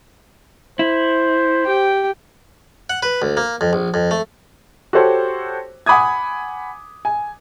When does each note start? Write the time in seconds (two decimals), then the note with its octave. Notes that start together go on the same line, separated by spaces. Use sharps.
0.79 E4 C5
1.65 G4 G5
2.90 F#5
3.03 B4
3.22 D2
3.37 A#3
3.61 F2
3.73 A#1
3.94 F2
4.11 A3
4.93 F#4 G4 A4 C5 C#5
5.86 F#5 G#5 B5 D6 D#6 G#6
7.05 G#5